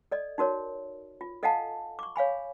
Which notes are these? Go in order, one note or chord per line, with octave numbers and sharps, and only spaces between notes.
A4 D5 D#5
D#4 F#4 A#4 C#5
F4
A4 D#5 F5 F#5 G#5 A5
C#6 D6
C#5 F5 G#5 B5